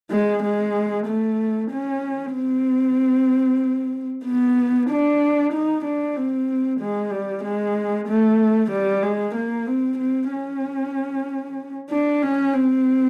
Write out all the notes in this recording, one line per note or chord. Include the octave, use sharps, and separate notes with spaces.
G#3
G#3
A3
C#4
C4
B3
D4
D#4
D4
C4
G#3
G3
G#3
A3
G3
G#3
A#3
C4
C4
C#4
D4
C#4
C4